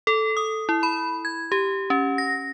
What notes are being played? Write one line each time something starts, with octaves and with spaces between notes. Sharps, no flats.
A4
D#6
E4
B5
G#6
G4
C#4
A#6